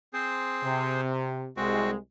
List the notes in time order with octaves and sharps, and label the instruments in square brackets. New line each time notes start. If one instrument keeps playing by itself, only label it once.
[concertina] C4 G#4 C5
[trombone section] C3
[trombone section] C2 G#3 [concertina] C4 F#4